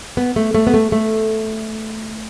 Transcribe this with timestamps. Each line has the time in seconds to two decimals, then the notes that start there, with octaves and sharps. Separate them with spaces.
0.17 B3
0.36 A3
0.55 A3
0.67 B3
0.74 A3
0.92 A3